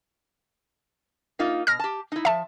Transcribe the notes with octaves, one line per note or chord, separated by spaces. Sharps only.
A#3 D#4 F4
B2 F6 A#6
G4 A5
D#4 E4
F3 E5 A5